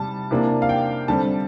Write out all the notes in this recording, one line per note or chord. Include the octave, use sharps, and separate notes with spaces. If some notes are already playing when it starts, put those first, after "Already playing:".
Already playing: C3 G3 A5
C3 E3 A#3 D4
F5
G5
D3 G3 C4 A5